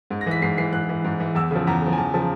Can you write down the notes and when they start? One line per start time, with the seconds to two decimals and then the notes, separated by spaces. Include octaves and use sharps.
0.11 G#2
0.21 A#6
0.26 E3 B6
0.42 G#2 C7
0.58 E3 C7
0.73 G#2 F#6
0.89 E3
1.04 G#2
1.20 E3
1.35 E2 E6
1.51 C#3 F3
1.67 E2 A#5
1.82 C#3 F3
1.93 G#5
1.98 E2 A5
2.14 C#3 F3 A5